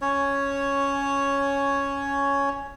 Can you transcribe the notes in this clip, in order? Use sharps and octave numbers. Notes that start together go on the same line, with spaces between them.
C#4 C#5